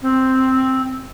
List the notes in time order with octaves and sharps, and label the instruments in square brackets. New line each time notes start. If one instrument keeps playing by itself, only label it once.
[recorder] C4